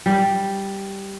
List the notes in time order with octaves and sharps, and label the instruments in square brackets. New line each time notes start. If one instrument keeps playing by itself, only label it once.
[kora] G3